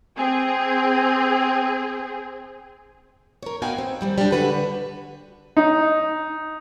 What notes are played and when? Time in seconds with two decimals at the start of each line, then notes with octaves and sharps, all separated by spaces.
0.16 C4 G#4
3.43 A#4 C#5
3.62 B3 D#4 F#4 F5 G5 G#5
3.78 C4
4.01 D#3 G3 C4
4.18 G3 D4
4.32 D3 F#4 B4
5.57 D#4